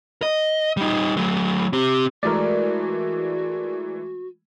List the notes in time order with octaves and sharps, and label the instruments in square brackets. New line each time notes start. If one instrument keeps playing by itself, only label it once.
[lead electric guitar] D#5
G3 D#4
F#3 A3
C4 G4
[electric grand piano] E3 G#3 A3 [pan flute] F#4 [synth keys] A#4 D5